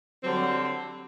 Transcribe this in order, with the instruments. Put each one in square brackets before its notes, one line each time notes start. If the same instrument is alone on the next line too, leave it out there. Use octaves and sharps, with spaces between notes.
[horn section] D3 G3 C4 [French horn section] F#3